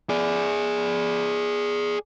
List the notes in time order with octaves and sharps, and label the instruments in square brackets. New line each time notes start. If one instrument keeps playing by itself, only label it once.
[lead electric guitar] G#4 D5